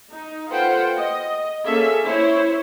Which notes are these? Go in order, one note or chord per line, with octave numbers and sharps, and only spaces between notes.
D#4
F4 A4 B4 C5 F#5 G5
D#5
A#3 C#4 G#4 A4 E5
E4 C5 C#5